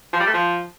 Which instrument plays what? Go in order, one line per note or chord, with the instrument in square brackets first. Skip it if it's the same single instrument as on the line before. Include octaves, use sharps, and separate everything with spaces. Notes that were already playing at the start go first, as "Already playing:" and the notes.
[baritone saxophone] F3
G3
A3
F3